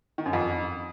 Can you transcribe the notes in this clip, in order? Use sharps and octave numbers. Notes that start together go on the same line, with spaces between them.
D#3
F#2
F2